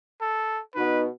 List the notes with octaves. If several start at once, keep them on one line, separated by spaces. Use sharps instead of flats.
A4
B2 D#4 B4